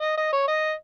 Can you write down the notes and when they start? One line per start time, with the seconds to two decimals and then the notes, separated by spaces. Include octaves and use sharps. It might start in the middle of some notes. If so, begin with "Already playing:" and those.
0.01 D#5
0.17 D#5
0.33 C#5
0.48 D#5